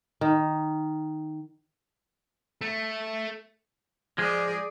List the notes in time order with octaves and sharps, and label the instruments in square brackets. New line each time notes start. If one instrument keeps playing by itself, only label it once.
[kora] D#3
[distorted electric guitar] A3
[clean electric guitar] F3 G#3 [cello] G#4 D5